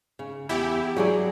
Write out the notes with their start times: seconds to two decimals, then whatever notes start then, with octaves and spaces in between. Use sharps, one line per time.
0.19 C#3
0.49 E2 E4 G4
0.96 F#3 G#4 D5